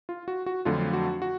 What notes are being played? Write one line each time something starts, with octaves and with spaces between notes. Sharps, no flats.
F4
F#4
F#4
F2 D3 F#3 A3 F4
F#4
F#4